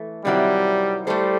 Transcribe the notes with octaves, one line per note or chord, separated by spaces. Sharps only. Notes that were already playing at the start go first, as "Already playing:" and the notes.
Already playing: E3 A3
C3 D#3 F#3 G3 C4 E4
G3 A3 E4 A4 C5